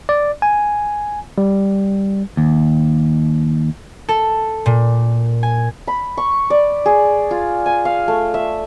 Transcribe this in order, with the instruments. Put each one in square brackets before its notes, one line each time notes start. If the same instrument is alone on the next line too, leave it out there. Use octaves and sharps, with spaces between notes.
[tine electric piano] D5
G#5
G3
[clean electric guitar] D#2
[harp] A4
A#2
G#5
[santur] B5
C#6
D5
G#4
F4
G#5
F5
A3
E5